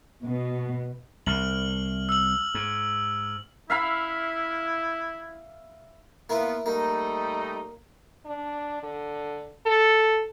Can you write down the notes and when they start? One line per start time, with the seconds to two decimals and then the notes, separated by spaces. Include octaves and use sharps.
0.23 B2
1.26 C2 F6 F#7
2.09 E6 F#7
2.54 G#2
3.70 E4 E5 F5 B5
6.29 A#3 B3 E4 F4
6.66 G3 A3 A#3 D#4
8.26 D4
8.83 D3
9.66 A4